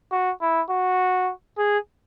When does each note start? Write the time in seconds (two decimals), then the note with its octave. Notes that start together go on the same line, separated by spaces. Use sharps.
0.12 F#4
0.41 E4
0.70 F#4
1.58 G#4